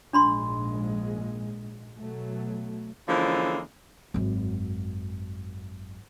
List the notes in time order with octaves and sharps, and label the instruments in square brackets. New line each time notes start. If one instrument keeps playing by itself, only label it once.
[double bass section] A#1 G#2 G#3 [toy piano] D4 B5 C6
[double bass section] B2 F#3 A3
[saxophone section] D3 E3 F3 G#3 A#3 C#4
[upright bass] G#1 F#2